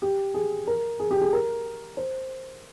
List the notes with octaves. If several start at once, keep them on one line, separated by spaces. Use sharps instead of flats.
G4
G#4
A#4
G#4
G4
G#4
A#4
C5